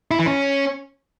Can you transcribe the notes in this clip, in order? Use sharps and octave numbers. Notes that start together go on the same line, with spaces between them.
E4
E3
C#4